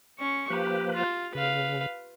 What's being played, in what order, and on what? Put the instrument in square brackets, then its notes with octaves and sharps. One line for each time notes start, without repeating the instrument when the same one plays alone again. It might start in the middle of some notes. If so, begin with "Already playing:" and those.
[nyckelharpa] C#4 C#6
[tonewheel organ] F3 A#3 B4 [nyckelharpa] G4
[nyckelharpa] F4
[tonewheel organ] C#3 [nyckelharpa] B4 F5